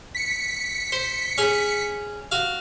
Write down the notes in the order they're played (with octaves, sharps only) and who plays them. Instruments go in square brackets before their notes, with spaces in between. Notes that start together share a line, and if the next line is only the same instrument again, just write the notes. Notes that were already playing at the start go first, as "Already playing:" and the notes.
[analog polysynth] B6 C#7
[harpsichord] C5
C#4 G#4
F#4 F5